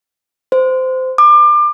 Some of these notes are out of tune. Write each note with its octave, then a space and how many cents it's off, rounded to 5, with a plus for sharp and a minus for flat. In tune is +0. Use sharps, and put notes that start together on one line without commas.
C5 -20
D6 +30